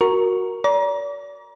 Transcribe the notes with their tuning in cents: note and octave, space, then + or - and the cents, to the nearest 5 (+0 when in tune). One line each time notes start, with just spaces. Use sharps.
F#4 +0 A#4 +0 C#6 +0
D5 -35 A#5 +30